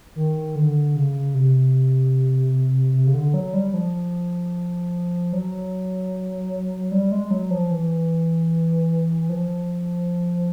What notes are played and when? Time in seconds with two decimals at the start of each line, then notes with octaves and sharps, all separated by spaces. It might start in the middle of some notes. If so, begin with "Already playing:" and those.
0.15 D#3
0.56 D3
0.96 C#3
1.35 C3
2.94 C3
3.07 C#3
3.14 D3
3.34 F#3
3.53 G3
3.74 F3
5.33 F#3
6.92 G3
7.12 G#3
7.31 F#3
7.50 F3
7.71 E3
9.29 F3